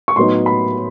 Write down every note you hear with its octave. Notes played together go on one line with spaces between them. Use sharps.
C#6
A2 F#3 B3 D#4 C6
B5